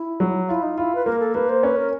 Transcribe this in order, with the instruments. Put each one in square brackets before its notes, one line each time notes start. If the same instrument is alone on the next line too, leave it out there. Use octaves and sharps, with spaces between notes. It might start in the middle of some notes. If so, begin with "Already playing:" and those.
Already playing: [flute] E4
[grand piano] F#3
[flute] E4 [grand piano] F4
[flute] D#4
[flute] E4 [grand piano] F4
[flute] B4
[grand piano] A#3 [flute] A#4
[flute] A4
[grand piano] A#3 [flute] B4
[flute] C5
[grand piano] C#4 [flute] B4
[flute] A#4